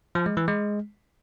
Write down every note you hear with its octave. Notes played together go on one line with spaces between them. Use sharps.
F3
G#3
E3
G#3